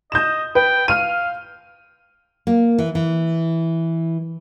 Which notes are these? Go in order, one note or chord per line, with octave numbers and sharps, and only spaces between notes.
D#5 G6 E7
B4 G5
F5 F6 D#7
A#3
E3
E3